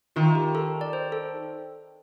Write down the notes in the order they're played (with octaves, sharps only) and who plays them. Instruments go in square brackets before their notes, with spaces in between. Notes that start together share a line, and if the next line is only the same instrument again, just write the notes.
[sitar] D#3 [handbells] F4
[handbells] G4
A4
D5
C5
A4